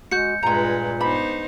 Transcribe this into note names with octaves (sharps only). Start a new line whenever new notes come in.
G#3 F#4 G6 C#7
G2 A#2 G#3 F4 B4 A#5
B3 D4 D#4 C5 B5